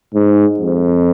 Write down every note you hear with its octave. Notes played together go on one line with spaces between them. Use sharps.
G#2
F2